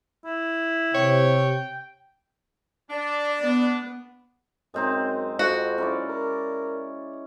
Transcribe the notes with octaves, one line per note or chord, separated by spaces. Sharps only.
E4
C3 C#5 G5
D4 D5
B3
F#2 G#3 C4 D#4
F2 F#4
C#4 E4 D5
A#4